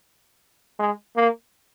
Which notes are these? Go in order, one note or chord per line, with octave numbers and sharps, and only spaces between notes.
G#3
A#3